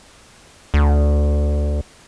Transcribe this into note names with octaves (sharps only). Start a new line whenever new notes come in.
D2